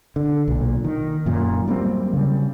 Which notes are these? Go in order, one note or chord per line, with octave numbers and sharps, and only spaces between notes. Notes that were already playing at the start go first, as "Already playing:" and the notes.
D3
B1 A#2
D#3
D#1 F#2 A#2
F#3 G3 A#3 C4
C#3 G3